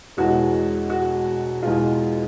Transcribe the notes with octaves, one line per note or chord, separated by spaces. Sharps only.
E1 E2 B2 G#3 F#4
F#4
E2 B2 G#3 F4